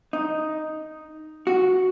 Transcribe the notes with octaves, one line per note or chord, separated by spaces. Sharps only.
D#4
F#4